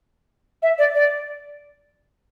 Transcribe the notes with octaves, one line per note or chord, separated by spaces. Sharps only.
E5
D5
D5